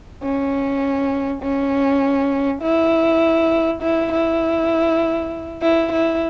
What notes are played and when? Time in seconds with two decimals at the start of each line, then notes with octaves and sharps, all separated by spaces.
0.23 C#4
1.43 C#4
2.62 E4
3.83 E4
4.12 E4
5.62 E4
5.92 E4